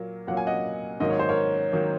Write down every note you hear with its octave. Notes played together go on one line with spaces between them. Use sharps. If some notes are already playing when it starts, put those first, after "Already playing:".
Already playing: A#2 F#3 A#3
A#2 F#3 A#3 F#5
G#5
D#5 F#5
G#2 D#3 F#3 A#3 D#5
C#5
C5
A#4 C#5
D#3 F#3 A#3